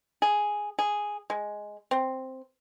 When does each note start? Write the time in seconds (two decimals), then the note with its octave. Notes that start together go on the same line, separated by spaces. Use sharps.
0.22 G#4
0.79 G#4
1.30 G#3
1.91 C4